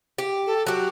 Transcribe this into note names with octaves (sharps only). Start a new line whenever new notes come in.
G4
A4
F#3 F#4 G4